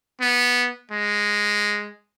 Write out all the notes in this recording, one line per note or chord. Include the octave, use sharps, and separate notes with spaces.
B3
G#3